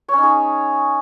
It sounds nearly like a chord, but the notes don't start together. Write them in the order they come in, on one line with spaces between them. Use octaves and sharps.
C#5 C#4 D#4 G#4